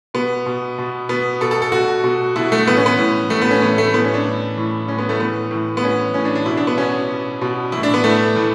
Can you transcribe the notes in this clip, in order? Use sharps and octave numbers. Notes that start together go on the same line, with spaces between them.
B2 B3
B2
B2
B2 B3
B2 A4
A4
A4
B2 F#4
B2
B2 E4
A3
A2 E3 B3
C#4
B3
A2 E3
A2 E3 A3
B3
C#4
A2 E3 B3
A3
A2 E3 B3
C#4
D4
A2 E3
A2 E3
A2 E3 C#4
B3
A3
A2 E3 B3
A2 E3
B3
A2 E3 C#4
A2 E3 C#4
D4
D4
B2 E4
D4
B3
B2 C#4
B2
B2
A2 E3 E4
D4
B3
A2 E3 A3
A2 E3